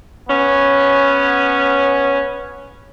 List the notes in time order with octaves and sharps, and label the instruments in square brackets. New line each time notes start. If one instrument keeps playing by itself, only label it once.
[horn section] B3 C#4